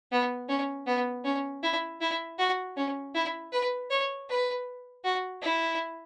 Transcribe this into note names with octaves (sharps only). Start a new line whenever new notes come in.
B3
C#4
B3
C#4
E4
E4
F#4
C#4
E4
B4
C#5
B4
F#4
E4